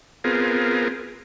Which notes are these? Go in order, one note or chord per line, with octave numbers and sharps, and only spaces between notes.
B3 C4 F4 G#4 A#4